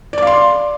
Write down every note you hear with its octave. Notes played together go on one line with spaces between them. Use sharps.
D5 F5 C6 D6